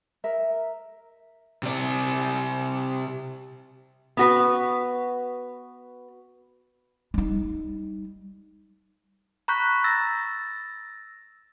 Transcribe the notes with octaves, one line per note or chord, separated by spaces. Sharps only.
A#4 E5
C3 D5
B3 F#4 B4
G3 D#4
A#5 B5 C#6 F#6 G6 B6
E6 A6 A#6